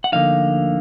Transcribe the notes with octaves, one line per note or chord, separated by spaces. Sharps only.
F#5
D2 D3 F3 A#3 D#4 F5